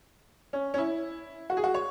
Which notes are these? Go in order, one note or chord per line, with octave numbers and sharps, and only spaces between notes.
C#4
C#4
E4
F#4
G#4
F#4
C#5